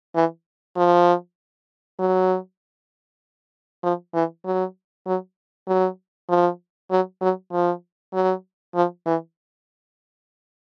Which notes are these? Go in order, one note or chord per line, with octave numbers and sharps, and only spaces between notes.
E3
F3
F#3
F3
E3
F#3
F#3
F#3
F3
F#3
F#3
F3
F#3
F3
E3